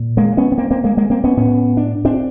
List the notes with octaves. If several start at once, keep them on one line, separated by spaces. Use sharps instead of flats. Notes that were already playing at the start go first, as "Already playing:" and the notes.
Already playing: A#2
G#3 A#3
B3 C#4
B3
A#3 C4
A#3 C4
G#3 A#3
G#3 A#3
A#3 C4
B3 C#4
A2 B3 C#4
D4
C4 D4